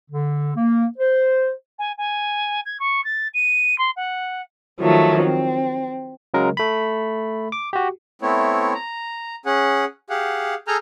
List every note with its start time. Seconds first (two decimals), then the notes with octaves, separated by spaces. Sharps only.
0.10 D3
0.56 A#3
0.98 C5
1.79 G#5
1.98 G#5
2.65 G#6
2.79 C#6
3.04 A6
3.34 D#7
3.78 C6
3.96 F#5
4.80 D#3 F3 F#3 A3
5.23 C4
6.34 C#3 F#3 G#3 A#4
6.57 A3 B5
7.52 D6
7.73 F#4 G4
8.22 A3 B3 C4 E4 C#5
8.74 A#5
9.46 C#4 G#4 F#5
10.10 G4 G#4 F5 F#5
10.68 G#4 A4 G#5 A#5 F6 G6